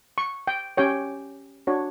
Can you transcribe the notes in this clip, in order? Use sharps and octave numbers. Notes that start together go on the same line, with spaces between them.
C#6
G5
C#4 G4 C#5 G5
D4 F#4 C#5